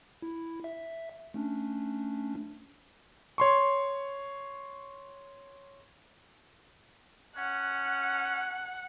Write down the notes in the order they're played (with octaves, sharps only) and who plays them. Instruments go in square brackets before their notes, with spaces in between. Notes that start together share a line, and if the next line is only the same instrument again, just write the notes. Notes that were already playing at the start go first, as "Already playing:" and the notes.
[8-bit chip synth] E4
E5
A3 C#4 D4
[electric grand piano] C#5 C6 C#6
[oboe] C#4 [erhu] F#5